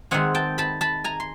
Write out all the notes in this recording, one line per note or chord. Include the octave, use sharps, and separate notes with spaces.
D#3 G#3 C4 F#5 G#5
G5 A5
A5 B5
A5 B5
G#5 A#5
C6